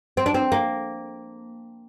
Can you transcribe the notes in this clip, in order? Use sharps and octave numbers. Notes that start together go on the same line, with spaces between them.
C4
D4
C4
A#3